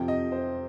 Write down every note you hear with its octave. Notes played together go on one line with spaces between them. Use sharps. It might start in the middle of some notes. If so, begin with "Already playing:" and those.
Already playing: F2 C3 F3 G5
D#5
C5